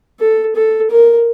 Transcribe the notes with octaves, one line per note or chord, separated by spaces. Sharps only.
A4
A4
A#4